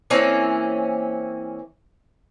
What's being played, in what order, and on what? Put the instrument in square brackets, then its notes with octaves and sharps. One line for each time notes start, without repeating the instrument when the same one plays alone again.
[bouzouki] E3 A#3 C4 C#4